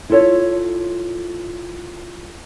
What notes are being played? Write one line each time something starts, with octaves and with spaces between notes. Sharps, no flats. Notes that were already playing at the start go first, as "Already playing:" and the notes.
E4 F4 A4 C#5